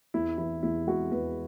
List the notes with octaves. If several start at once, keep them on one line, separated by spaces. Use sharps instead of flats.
E2 E4
E3 E4
E2 E4
G#3 F#4
E2 B4